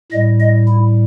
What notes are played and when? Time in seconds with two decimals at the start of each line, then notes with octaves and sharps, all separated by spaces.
0.12 A2 G3 D#5
0.40 D#5
0.68 E4